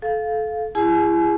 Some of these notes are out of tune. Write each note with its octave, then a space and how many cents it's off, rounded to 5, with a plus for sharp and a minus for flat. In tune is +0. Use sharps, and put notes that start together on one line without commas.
A4 -25 F5 +0
E4 +35 G#4 -30 G#5 +40